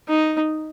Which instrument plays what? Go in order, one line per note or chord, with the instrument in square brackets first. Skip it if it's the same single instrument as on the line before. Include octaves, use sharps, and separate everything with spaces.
[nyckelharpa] D#4